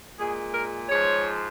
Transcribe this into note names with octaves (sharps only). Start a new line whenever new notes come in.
A#2 G#3 G#4
A#4
G#2 F3 G#3 C#5